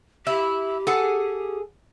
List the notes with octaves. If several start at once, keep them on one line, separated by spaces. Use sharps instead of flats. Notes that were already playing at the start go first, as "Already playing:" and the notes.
E4 G4
G#4 A4 F#5